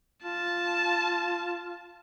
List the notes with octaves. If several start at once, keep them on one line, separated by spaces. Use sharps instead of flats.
F4 A5